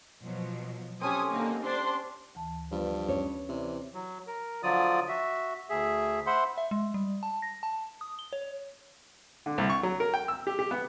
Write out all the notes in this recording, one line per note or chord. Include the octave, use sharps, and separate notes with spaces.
B2 F3 F#3
C4 C#4 G4 A4 G#5 D#6
D3 A#3 D#4
D4 C5 C6
D2 E3 A5
G2 F3 B3 B4 D5
C#4 C#5
C3 E3 D5
F#3
A#4
D3 F3 F#3 F4 D5 D#6
F#4 E5
D2 G#4 E5
C5 E5 F#5 B5 C6
E5
G#3
G3
A5
A#6
A5
D#6
G7
C#5
D3
C2
C#6
F#3
A#4
G5
E6
G4
G4
B3